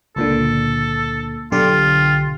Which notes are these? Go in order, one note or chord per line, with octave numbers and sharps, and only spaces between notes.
C#2 A#2 D3 A4
B1 D3 F4 G4